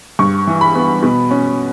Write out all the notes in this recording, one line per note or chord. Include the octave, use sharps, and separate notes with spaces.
G2 C#6
E3
B5
B3
B2
C#4